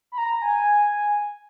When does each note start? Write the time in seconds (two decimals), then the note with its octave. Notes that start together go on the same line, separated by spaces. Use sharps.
0.12 B5
0.18 A#5
0.42 G#5